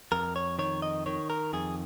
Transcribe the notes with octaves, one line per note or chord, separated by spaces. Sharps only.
F2 A#4
C#5
D#3 C#5
D#5
D#3 C#5
A#4
F2 G#4